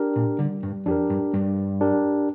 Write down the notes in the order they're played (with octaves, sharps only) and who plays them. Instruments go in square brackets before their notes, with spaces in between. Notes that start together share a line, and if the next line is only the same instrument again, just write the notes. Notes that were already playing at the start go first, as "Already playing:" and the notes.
Already playing: [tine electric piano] D4 G4 A#4
[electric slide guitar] A#2
[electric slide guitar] D3 [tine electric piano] G3
[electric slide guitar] G2
[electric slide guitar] F2 [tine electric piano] D4 G4 A#4
[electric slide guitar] G2
[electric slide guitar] G2 [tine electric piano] G3
[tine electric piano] D4 G4 A#4